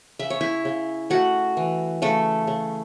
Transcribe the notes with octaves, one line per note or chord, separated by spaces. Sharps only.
C#3 E5
C#5
E4 E5
C#3
A3 F#4 F#5
E3
C#3 A3 A4
C#3